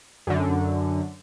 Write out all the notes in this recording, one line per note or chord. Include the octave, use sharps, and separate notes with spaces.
F#2 D3